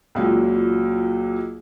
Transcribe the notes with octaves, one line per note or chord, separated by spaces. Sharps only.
C#2 A#2 F#3